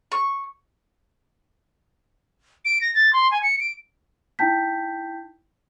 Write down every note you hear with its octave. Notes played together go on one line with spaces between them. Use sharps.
C#6
D7
A#6
A6
C6
G#5
C#7
D7
D#4 E4 G5 A5 G6 B6